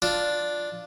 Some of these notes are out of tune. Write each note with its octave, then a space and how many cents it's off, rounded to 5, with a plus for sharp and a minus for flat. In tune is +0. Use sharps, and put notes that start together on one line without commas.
D4 +0 F4 +0